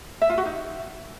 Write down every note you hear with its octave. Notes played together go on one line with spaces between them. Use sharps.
E5
F4
F#4
D#4